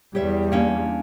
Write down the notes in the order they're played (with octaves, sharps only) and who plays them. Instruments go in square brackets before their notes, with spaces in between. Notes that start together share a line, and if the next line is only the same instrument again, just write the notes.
[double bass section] E2 G3 [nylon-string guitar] G4 C#5 E5
[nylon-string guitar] A#3 C#4 D4